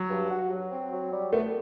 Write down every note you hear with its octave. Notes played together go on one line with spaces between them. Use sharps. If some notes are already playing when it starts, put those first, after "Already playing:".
Already playing: F#3
G2
F#4
F#3
C4
F#3
G3
A3 B3